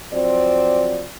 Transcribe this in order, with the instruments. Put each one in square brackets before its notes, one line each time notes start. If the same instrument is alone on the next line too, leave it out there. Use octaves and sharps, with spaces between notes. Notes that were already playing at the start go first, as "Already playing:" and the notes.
[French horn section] F3 F#3 C4 D5